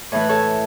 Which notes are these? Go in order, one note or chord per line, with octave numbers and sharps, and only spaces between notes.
A2 E3 A3 C#5
B4
A4 C#5